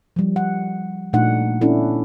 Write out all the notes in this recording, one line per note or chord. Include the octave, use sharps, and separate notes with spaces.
F3 G3
F#5
A#2 A3 D4 D#4 F#5
B3 C#4 D4 E4 A4